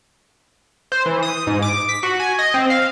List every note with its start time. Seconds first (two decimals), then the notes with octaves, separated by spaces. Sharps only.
0.92 C5
1.06 E3
1.23 D#6
1.47 G#2
1.62 D6
1.89 B6
2.03 F#4
2.20 G#5
2.39 D#5
2.54 C4
2.70 F5